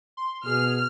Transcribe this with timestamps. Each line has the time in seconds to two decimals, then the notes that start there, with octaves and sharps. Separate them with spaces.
0.17 C6
0.46 B2 G#4 F6